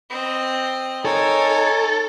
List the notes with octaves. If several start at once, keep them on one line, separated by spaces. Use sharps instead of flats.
C4 D#5
D#4 A4 A#4 C#5 G#5